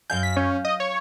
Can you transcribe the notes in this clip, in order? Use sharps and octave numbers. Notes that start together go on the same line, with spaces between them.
F#2 F5 G#5 G6
B6
C#4 G6
D#5
C#5